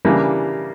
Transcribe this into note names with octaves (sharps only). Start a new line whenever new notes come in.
C#3 E3 G3 A#3 D4